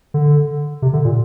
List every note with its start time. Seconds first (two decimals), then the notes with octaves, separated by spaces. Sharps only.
0.14 D3
0.82 C3
0.93 D3
1.05 A#2